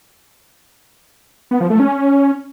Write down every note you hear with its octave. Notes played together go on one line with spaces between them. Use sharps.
B3
F3
A3
C#4